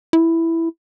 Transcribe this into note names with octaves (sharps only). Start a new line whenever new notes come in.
E4